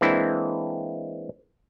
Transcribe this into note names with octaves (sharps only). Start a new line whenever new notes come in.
E3 G#3 A#3 C4 D4 E4